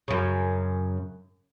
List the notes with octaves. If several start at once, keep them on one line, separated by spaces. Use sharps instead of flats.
F#2 C#3